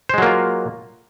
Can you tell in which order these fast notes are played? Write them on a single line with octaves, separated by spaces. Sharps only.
C5 G#3 F#3 A#3 F4